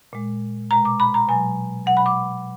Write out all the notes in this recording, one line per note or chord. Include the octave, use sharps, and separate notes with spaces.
A#2 G#3
B2 G#3 A#5
D6
B5
A#5
B2 F#3 G#5
B2 F#3 F#5
B5
D6